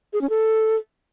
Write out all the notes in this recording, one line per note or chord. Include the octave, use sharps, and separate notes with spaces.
G#4
C#4
A4